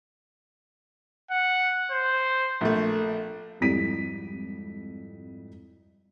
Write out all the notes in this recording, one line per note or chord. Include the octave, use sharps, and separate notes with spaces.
F#5
C5
A#1 A3
G#1 F2 G3 E4 B6 D#7